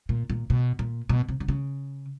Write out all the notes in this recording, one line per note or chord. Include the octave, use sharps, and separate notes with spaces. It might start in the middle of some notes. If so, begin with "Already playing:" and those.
A#2
A#2
B2
A#2
B2
C3
D3
C#3